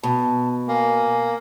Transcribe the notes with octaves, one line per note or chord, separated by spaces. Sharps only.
B2 A5
A#3 G#5